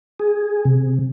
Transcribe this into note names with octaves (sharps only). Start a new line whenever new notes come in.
G#4
C3